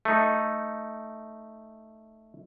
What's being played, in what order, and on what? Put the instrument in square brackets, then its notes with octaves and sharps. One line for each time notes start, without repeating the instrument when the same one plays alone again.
[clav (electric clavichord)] A3 D#4